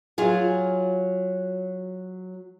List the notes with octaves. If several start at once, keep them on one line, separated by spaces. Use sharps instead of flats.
F#3 F4 G#4